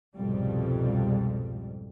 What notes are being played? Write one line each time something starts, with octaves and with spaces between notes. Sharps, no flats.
C2 F2 G#2 B2 G3